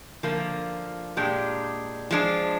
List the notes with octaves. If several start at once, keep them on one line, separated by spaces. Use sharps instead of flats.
D3 F3 A#3 F4
A#2 G#3 D4 G4
F3 G#3 D4